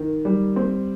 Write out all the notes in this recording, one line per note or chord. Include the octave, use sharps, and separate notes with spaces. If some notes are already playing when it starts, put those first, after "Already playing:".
Already playing: D#3
G3
C4